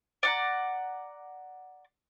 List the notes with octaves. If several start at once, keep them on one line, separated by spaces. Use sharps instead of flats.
D5 F#5 A#5